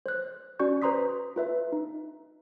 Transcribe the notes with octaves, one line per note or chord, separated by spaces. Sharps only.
C5 F#6
C#4 F#4 D5 C#6 G6
B4 C5 A#5 C6 D#6 B6
F4 B4 E5
D#4